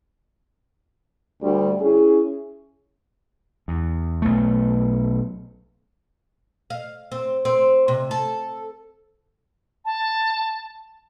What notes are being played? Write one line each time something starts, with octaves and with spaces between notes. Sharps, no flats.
D2 G3
C#4 E4 G#4
E2
B1 A3
F5
C4
C4
C3
A4
A5